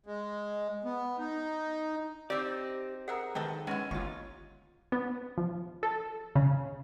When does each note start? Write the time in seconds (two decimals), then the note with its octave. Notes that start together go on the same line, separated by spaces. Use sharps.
0.06 G#3
0.85 B3
1.19 D#4
2.30 C4 D#4 G4 D5
3.08 G#4 A#4 E5 F#5
3.35 G#2 D#3 G4 A4 B4 D#5
3.67 G#3 B3 C#4 E4
3.91 G1 D#2 F4 C#6
4.92 B3
5.38 F3
5.83 A4
6.35 C#3